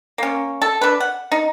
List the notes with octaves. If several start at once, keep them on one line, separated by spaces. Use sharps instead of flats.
A#3 C#4
A4
D4 B4
F#5
D#4